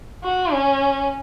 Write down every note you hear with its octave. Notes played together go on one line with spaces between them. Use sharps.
F#4
C#4